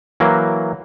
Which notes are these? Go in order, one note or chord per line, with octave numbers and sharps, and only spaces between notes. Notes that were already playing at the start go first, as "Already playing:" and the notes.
E3 F#3 A#3